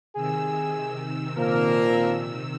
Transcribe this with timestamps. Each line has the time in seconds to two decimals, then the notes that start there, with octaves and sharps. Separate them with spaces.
0.15 C3 D#3 G#4 E6
1.38 A#2 F3 A#3 A#4